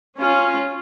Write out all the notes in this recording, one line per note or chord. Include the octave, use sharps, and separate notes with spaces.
C#4 F4